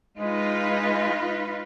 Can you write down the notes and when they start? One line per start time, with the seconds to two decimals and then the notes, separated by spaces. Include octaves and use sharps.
0.17 G#3 D#4 F4 B4